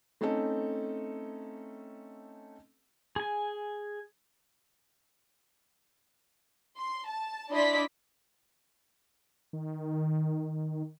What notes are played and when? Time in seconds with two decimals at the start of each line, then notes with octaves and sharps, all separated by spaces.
0.21 A3 C4 C#4 D#4 A4
3.16 G#4 G#5
6.78 C6
7.08 A5
7.51 D4 E4 D5 D#5 C6 B6
9.53 D#3